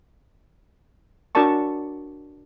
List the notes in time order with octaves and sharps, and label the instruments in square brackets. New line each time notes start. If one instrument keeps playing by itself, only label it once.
[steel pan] D4 F#4 A#4 D5 A5 C#6